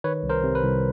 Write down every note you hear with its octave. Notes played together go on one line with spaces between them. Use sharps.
D#3 B4 C#5
C2
A#4 C5
C3
B4
C2